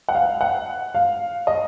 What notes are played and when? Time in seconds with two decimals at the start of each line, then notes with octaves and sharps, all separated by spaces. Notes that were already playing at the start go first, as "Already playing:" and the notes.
0.09 F#5
0.15 F5
0.41 F#5
0.95 F5
1.47 D#5